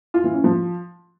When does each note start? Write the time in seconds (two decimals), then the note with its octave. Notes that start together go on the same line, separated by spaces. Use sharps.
0.14 F4
0.24 E3
0.34 C#4
0.44 F3